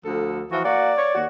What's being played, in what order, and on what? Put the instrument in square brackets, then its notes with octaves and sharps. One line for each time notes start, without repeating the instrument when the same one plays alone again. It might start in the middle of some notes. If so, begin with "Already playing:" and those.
[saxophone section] D2 F3 A4
[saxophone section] E3 F3 [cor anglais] F#4
[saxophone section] A#3 F#4 [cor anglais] D5
[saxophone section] C#5
D#2 F#4